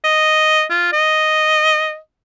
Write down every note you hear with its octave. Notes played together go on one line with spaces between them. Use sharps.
D#5
F4
D#5